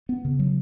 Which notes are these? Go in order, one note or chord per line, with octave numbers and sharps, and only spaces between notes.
B3
C#3
F#3